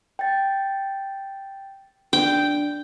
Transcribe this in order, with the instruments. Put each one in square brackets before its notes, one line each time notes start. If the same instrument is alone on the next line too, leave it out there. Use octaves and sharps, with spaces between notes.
[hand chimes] G5 A6
[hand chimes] D4 [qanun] G5